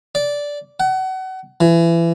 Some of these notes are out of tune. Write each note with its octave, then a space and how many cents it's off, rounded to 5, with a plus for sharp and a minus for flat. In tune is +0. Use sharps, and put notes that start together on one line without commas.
D5 -10
F#5 +30
E3 +25